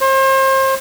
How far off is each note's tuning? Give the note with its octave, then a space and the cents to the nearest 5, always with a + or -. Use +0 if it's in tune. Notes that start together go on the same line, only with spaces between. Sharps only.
C5 +35